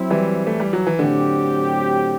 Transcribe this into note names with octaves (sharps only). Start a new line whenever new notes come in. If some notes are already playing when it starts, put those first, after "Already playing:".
Already playing: F#3 C4 E4
E3 G3
A3
G3
F#3
E3
A2 D3 F#3 C4 G4